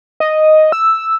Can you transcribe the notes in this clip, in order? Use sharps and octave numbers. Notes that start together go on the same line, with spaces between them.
D#5
E6